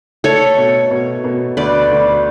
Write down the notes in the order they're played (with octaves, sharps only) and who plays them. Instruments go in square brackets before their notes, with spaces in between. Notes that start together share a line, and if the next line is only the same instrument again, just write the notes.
[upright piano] A3 [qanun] A4 C#5
[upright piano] B2
B2
B2
[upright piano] D2 [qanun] B4 D5
[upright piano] D2